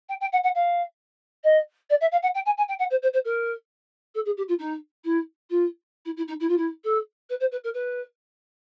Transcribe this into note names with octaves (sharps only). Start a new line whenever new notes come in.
G5
G5
F#5
F#5
F5
D#5
D5
E5
F5
F#5
G5
G#5
G#5
G5
F#5
C5
C5
C5
A#4
A4
G#4
G4
F4
D#4
E4
F4
E4
E4
D#4
E4
F4
E4
A4
B4
C5
B4
A#4
B4